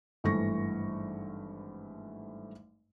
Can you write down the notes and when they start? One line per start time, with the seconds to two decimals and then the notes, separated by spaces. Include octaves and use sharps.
0.24 G#1 G2 E3 A3 C#6 A#6